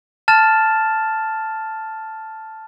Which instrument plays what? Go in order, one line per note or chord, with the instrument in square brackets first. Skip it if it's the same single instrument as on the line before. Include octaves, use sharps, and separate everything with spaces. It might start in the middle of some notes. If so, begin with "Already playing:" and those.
[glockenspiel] A5 F6 A6 E7